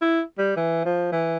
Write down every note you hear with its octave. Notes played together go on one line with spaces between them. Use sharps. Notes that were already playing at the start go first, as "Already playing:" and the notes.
E4
G3
E3
F3
E3